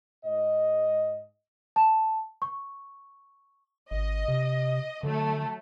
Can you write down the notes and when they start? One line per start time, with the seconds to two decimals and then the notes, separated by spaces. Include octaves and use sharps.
0.25 G#2 D#5
1.76 A5
2.42 C#6
3.91 G#1 D#5
4.28 C3
5.03 D3 F#3 A3